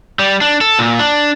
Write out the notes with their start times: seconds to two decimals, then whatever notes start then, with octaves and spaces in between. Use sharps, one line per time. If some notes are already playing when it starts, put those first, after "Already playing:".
0.19 G3
0.41 D4
0.61 A4
0.79 A#2
0.99 D4